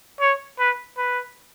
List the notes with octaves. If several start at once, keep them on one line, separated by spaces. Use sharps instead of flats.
C#5
B4
B4